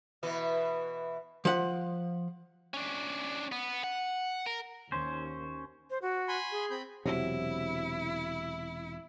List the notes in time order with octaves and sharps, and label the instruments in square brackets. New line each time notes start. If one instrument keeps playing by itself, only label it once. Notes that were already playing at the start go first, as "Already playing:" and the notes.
[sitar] B2 E3 B4
[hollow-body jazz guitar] F3 F#5
[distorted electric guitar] C#4 D4
B3
F#5
A#4
[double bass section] D#2 [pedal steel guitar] C#4 C5
[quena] C5
F#4
[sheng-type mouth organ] G#5 B5 C6
[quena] G#4
[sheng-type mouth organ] C4 B5 G6
[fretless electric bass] E1 C3 F#3 [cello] E4